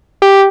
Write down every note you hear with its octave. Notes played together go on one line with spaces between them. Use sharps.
G4